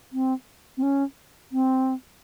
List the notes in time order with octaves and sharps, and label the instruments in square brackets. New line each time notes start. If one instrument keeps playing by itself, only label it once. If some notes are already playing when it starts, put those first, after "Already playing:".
[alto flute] C4
C4
C#4
C4